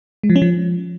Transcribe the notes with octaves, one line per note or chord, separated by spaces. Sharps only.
G#3
F3
C#4
F3